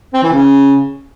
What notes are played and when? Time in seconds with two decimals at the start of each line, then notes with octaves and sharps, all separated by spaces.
0.14 C4
0.23 E3
0.33 C#3